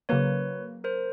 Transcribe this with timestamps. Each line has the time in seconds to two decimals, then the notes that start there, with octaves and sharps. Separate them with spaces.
0.09 C#3 F#3 A#3 B4 C#5
0.84 A#4 C5